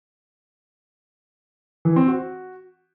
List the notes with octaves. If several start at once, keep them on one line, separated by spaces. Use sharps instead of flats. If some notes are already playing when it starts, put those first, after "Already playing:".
E3
C4
F#4